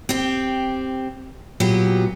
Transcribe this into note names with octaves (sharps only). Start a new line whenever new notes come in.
C4 G4
A#2 F#3 B3 G4